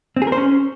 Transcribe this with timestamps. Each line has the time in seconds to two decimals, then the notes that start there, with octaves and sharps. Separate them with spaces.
0.17 C4
0.22 G#4
0.27 A#4
0.32 C5
0.37 C#4